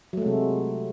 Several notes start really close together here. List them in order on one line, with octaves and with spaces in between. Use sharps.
F#3 A3 G#3 C3